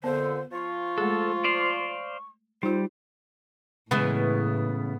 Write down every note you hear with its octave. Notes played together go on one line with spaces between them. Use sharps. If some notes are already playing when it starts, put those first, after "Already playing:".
F2 A#2 D3 B3 C5
F3 F4 C#6
G#3 A3 G#4 A4
C5 D5 F5
G3 D#4 F4 C5
A2 C#3 E3 G#3 B3